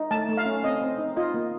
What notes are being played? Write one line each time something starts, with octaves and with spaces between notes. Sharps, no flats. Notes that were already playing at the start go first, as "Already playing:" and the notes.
Already playing: D#4
A3 A5
A3
F5
C#4
C4 D#5
C4
D#4
F4 D#5
A#3